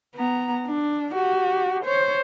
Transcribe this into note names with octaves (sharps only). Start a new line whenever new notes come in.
B3 A#5
D4
F#4 G4
C5 C#5